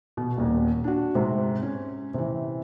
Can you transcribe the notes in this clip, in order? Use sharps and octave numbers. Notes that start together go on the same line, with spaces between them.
B2
D#1 D#2
D4 F#4
G#2 C3
C#4
C3 E3